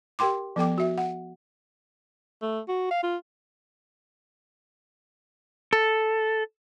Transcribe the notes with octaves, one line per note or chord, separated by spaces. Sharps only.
G4 A#4 G5 C6 D6
F3 B3 A4 G5 D6
F#4 E5
F#5
A3
F#4
F5
F4
A4